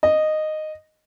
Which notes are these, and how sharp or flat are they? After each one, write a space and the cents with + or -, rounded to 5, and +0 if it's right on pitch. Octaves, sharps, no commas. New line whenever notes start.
D#5 -10